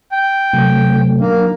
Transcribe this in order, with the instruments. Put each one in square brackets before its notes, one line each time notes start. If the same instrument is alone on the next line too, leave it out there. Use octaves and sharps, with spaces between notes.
[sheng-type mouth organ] G5
[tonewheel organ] C3 F#3 A3
[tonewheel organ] F#3 D4 [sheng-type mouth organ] A#3